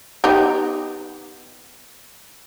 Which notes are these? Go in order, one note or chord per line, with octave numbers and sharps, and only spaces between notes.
B3 D#4 G4